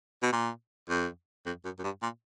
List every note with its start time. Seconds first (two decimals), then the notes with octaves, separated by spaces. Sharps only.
0.22 B2
0.32 A#2
0.89 F2
1.46 F2
1.64 F#2
1.79 F#2
1.84 G2
2.02 A#2